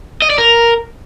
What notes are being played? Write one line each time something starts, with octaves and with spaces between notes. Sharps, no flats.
D#5
D5
A#4